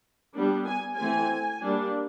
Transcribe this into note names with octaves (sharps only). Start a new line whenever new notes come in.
G3 B3 D4
G#5
E3 A3 C4 G#5
G3 A#3 D4